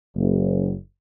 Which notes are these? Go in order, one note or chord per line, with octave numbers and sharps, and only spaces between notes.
F#1